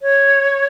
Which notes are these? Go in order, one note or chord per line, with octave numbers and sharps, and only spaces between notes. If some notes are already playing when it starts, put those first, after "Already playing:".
C#5